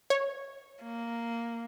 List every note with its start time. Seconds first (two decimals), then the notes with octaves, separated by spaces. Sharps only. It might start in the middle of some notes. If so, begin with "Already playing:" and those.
0.10 C#5
0.83 A#3